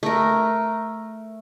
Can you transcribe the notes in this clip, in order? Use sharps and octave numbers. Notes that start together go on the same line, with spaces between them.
A3 A#4